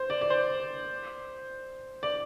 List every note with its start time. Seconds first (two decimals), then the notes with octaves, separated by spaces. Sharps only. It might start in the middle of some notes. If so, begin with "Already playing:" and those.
Already playing: C5
0.10 D5
0.21 D5
0.30 C5
2.03 D5